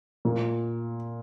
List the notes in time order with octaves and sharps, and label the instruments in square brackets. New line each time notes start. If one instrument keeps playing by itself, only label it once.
[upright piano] A#2